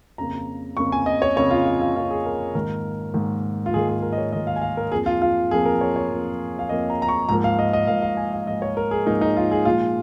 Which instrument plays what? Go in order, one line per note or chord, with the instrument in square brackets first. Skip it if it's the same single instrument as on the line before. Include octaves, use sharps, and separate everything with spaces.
[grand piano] F2 C#3 A#3 A#5
F2 C#3 A#3 C#6
G#5
D#5
C#5
F2 C#3 A#3 C#5
F4
F4
F4
F2 C#3 A#3 F4
G#4
A#4
G#2 D#3 A#3 A#4
G#2 D#3 A#3
F4
G#2 D#3 A#3 G#4
G#4
A#4
D#5
C#5
G#2 D#3 A#3 D#5
F5
G#5
F5
A#4
F2 F3 A#3 G#4
F4
F4
F2 F3 A#3 G#4
A#4
C#5
C#5
F2 F3 A#3
F5
F2 F3 A#3 D#5
A#5
A#5
C#6
G#2 F3 A#3 A#5
F5
D#5
D#5
G#2 F3 A#3 F5
F5
G#5
F5
G#2 F3 A#3 D#5
C#5
A#4
G#4
G#2 F3 A#3 D#4
D#4
F4
G#4
A#2 F3 G#3 F4